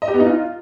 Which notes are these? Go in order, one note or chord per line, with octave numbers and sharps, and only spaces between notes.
D#5
G4
B3
D#4
F4